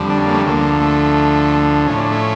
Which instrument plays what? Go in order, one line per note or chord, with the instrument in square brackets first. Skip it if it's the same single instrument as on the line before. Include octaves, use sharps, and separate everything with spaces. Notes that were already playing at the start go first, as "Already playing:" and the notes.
Already playing: [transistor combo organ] F2 D3 G3
D4
C#4
A#3
A3 C#4
D2 D3 F3 A#3
A3
A2 F3 C#4
D4
A3 C#4